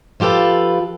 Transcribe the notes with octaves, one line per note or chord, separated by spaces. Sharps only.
F3 F4 G4 A4 B4